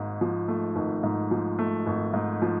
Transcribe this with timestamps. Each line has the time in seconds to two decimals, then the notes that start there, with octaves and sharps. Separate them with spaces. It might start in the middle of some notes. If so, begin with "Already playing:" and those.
Already playing: G#1 G#2
0.21 F3
0.48 A3
0.76 G#1
1.03 G#2
1.31 F3
1.59 A3
1.87 G#1
2.14 G#2
2.42 F3